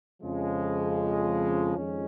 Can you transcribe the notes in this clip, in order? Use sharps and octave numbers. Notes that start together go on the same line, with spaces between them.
F2 C#3 F3 G#3
F2 D#3 G#3 C#4